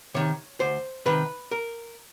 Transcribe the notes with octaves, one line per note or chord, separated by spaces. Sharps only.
C3 D#3 C#5
D2 C5
C3 D#3 B4
A#4